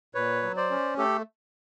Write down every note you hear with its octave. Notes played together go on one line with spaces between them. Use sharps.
A#2 B4 C#5
F#3
C5 D5
C#4
A3 G4 A4